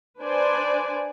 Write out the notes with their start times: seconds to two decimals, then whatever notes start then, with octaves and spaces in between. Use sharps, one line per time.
0.19 D4 B4 C5 D5 G#5